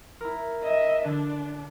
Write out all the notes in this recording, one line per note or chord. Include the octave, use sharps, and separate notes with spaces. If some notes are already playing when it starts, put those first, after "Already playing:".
E4 A#4
D#5 E5
D3 D4